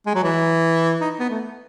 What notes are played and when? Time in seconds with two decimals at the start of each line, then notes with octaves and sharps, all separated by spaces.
0.07 G#3
0.15 F#3
0.24 E3
1.01 D#4
1.20 B3
1.30 A3